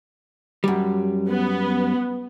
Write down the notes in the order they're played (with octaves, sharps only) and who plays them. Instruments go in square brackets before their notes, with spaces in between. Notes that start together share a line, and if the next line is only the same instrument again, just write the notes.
[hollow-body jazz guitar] F#2 G3
[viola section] B3